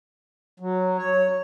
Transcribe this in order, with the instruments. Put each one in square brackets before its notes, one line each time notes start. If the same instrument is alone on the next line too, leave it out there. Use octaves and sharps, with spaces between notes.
[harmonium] F#3
C#5